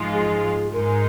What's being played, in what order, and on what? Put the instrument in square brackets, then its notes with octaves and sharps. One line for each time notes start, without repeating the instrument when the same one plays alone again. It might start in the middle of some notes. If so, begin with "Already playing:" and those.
Already playing: [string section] G#2 F3 G#3 F4
[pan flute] G#4
[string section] G#2 G#3 D#4 [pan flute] A#4